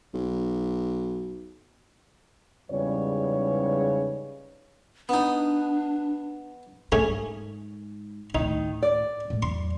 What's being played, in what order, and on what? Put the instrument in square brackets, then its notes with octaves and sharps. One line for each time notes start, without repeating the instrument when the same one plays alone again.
[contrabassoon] B1
[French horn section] E2 G#2 C#3 G3 B4 C#5
[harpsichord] B3 D#4 [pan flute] D4
[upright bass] G#2 [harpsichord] A3 C#4 G#4
[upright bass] D2 A2 [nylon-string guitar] D#3 [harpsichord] D#4
[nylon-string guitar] D5
[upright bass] A2 G#3
[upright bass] E2 F#3 [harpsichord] C6